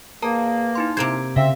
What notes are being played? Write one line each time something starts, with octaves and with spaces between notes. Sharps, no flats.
E2 A#3 A#4 A5 A#5
D#4 E4 C6
C3 A#3 C5 G#6 D7
C#3 C4 E5 F5